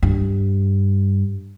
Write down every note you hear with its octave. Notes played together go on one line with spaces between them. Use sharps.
G2